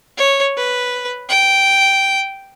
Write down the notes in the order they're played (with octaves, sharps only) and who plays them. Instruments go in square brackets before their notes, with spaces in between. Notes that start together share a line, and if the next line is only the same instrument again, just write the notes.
[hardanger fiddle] C#5
B4
G5